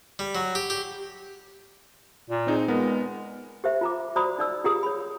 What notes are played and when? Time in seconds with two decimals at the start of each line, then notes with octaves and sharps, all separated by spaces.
0.19 G3
0.35 F#3
0.55 G4
0.70 G4
2.30 A#2
2.47 C4 D#4 G#4
2.68 G#3 B3 A#4
3.64 G4 C5 E5
3.81 F4 A#5 D6
4.16 F#4 C5 D5 A#5 B5 D#6
4.38 D#4 D5 E6
4.64 F4 G4 G#4 A#5 D#6
4.83 C#5 B5